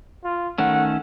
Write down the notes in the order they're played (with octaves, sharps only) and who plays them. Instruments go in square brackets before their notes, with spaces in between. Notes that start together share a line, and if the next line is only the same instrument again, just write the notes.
[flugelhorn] F4
[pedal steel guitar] D#3 A3 C#4 [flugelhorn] F#5